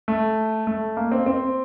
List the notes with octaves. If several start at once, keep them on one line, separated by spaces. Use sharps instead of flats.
A3
A3
A#3
C4
C4